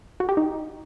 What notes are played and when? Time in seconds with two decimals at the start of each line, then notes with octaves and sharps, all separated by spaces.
0.20 F#4
0.29 G4
0.37 D#4